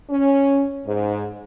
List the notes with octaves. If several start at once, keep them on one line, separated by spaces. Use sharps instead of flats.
C#4
G#2